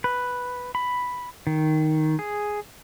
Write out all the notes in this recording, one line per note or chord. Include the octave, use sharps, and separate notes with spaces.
B4
B5
D#3
G#4